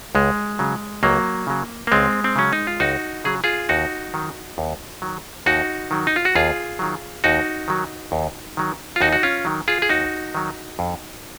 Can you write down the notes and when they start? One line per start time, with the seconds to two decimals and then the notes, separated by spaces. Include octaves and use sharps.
0.15 C#2 G#3
0.59 C#3 F#3
1.03 C#2 F#3 A#3
1.47 C#3 F#3
1.87 A#3
1.92 C#2 G#3 C4
2.24 C4
2.36 C#3 F#3 C#4
2.53 D#4
2.67 F4
2.80 C#2 D#4 F#4
3.24 C#3 F#3 G#4
3.44 F4 G#4
3.69 D#2 D#4 F#4
4.14 D#3 F#3
4.58 D#2
5.02 D#3 F#3
5.46 D#2 D#4 F#4
5.91 D#3 F#3
6.07 D#4
6.16 F4
6.25 F#4
6.35 D#2 F4 G#4
6.79 D#3 F#3
7.24 D#2 D#4 F#4
7.68 D#3 F#3
8.12 D#2
8.57 D#3 F#3
8.96 F4
9.01 D#2 D#4 F#4
9.13 F#4
9.23 C#4 F4
9.45 D#3 F#3
9.68 F4 G#4
9.82 G#4
9.89 D#2 D#4 F#4
10.35 D#3 F#3
10.79 F2